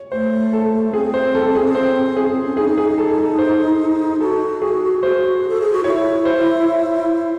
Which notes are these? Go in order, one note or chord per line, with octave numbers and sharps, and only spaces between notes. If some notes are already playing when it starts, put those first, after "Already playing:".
Already playing: C#5
A3 C5
A4
C4 G#4
C5
A4
G#4
C5
G#4
C4
C#4
D#4 G#4
G#4
A4
A4
C5
F#4 A4
G#4
C5
A4
G#4
F#4
E4 C#5
C5